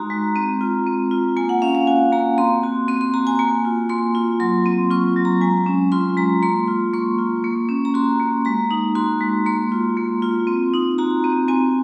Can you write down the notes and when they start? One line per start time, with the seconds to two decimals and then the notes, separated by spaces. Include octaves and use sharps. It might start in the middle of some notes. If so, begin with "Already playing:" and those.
Already playing: G#3 D#4 F#4 A#5 C6
0.10 G#3
0.36 C4
0.61 F4
0.87 C4
1.11 F4
1.37 A#3 G#5
1.49 F#5
1.62 C#4 F5
1.75 F5
1.87 F#4 G#5
2.12 A#3 A#5
2.38 C4 C6
2.63 F#4
2.88 C4 C6
3.01 C6
3.14 F#4 A#5
3.27 G#5
3.39 A#3 G#5
3.65 F4
3.89 A#3 C6
4.15 F4
4.40 F#3 C6
4.66 C4
4.91 F4 C#6
5.16 F#3
5.25 A#5
5.41 G#3 G#5
5.66 C#4
5.92 F4 C6
6.17 G#3 A#5
6.43 A#3 C6
6.68 F4
6.93 A#3 C#6
7.18 F4
7.44 A#3
7.69 C#4
7.85 A#5
7.94 F#4 C6
8.20 A#3
8.45 G#3 A#5
8.71 D#4
8.95 F#4 C6
9.21 G#3
9.46 A#3 C6
9.72 F4
9.97 A#3
10.22 F4
10.47 C4
10.73 D#4
10.98 F#4 A#5
11.24 C4
11.48 C4 G#5